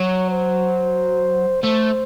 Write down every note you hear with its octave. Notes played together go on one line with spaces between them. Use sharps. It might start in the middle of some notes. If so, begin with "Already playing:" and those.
Already playing: F#3 C#5
C5
A3 C5